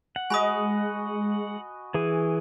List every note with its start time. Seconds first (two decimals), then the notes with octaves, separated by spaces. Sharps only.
0.16 F#5
0.30 G#3 F#4 D#5 G#5 B5 D#6
1.94 E3 G#4